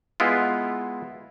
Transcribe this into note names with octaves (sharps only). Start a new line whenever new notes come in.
G#3 B3 E4 F4